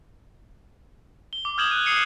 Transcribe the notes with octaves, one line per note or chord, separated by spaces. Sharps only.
G7
D6
D#6 F6 G6 G#6 E7 F#7
F#6 D#7
D#6 C7 C#7 D#7